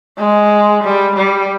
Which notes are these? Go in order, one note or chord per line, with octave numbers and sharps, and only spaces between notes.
G#3
G3
G3